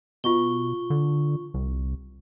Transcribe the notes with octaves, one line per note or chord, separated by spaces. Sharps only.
B2 F4 C#6 G7
D3
C2